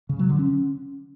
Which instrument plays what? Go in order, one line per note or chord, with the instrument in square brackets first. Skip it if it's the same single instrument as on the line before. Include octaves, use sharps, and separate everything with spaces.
[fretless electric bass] C#3
F#3
D3
C#4